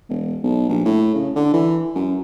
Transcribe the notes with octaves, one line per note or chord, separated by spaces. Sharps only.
E1
B1
A#1
A2
C#3
D3
E3
F#2